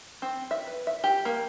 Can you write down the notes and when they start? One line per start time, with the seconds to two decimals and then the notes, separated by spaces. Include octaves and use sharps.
0.22 C4
0.51 E5
0.67 B4
0.87 E5
1.04 G4
1.25 A#3